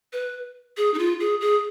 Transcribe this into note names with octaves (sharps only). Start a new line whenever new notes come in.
B4
G#4
D#4
F4
G#4
G#4